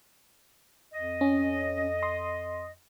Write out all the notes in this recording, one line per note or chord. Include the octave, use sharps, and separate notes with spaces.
F2 D#5
C#4
C6 D#6